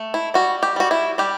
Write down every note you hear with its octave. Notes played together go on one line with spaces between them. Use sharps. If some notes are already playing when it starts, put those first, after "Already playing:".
Already playing: A3
E4
G3 F#4
G4
G3 F#4
E4
G3 G4